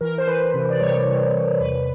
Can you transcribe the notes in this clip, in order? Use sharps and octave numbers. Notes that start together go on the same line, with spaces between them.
E3 A#4
C5
E3 B4
C3
D5
G3 C#5
C3
C3
E2 B4